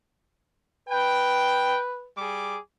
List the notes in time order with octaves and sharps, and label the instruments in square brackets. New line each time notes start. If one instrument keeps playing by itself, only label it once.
[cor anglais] B4 [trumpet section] G5
[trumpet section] G3 G#4 D6